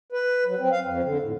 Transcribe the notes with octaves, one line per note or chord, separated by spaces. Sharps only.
B4
F#3
C4
F5
F2
D3
A2